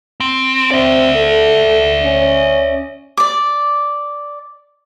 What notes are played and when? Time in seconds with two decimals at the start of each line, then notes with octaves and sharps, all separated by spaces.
0.20 C4
0.71 C4 D5 E5
1.16 A4
2.02 C#4
3.17 D5 D6